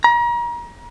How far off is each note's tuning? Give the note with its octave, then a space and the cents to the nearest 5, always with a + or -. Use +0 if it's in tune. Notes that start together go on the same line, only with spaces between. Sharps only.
A#5 +35